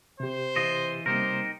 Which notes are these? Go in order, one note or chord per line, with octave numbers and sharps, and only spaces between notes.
C3 G4 C5
E3 F4 D#5
C3 G3 A#3 D#4 G4 A#4 C5